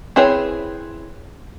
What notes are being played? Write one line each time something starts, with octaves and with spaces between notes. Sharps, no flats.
C4 E4 G#4 B4 C#5